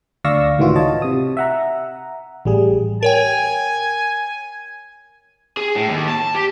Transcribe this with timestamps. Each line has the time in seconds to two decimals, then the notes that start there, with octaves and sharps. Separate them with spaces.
0.24 D2 D5 F5 C#6 E6 A#6
0.58 C#2 A2 D#3 E3 F4 F#4
0.76 C#5 D#5 A5
1.02 C3 D#6
1.37 E5 F#5 A#5
2.45 A1 G3 G#4
3.03 A#4 C#5 G5 G#5
5.57 G#4
5.75 A2
5.88 D#2
6.08 A5
6.35 G4